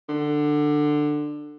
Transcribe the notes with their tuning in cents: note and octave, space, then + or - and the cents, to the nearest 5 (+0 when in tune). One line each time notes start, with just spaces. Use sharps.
D3 +15